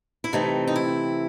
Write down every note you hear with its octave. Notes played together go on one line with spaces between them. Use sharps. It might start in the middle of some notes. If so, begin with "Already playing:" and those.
E4
C3 E3 A3 C4 D#4
D#4
E4